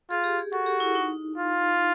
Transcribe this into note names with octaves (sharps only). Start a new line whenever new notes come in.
F4 G#4
G4
G#4
F#4 A4
G4
E4
D#4
F4